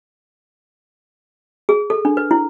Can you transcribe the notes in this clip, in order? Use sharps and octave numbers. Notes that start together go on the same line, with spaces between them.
G#4
A4
D4
B4
E4